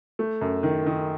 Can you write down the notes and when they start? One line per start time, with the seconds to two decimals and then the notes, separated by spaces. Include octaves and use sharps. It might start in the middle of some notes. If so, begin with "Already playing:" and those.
0.19 A3
0.41 F#2
0.63 D#3
0.86 D#3